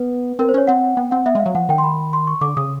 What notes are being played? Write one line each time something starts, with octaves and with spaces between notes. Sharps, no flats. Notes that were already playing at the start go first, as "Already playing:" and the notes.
Already playing: B3 B4
C4 A#4
C5
C#4 C#5
C4 F#5
B3 G5
C4 F#5
B3 E5
G#3
F5
F#3
F3 F#5
D#3 G5
C6
B5
C6
C#6
D3 D6
C#3 D#6